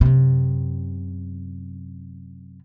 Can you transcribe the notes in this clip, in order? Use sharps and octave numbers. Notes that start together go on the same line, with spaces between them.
F#2 C3